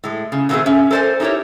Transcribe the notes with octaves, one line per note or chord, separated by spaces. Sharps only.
A2 G#3
C#3
B2 D#3 A3 A#3 C4 G#4
C#4 E5
A4 A#4 C5 D5 G#5
D#4 E4 G4 A#4 C#5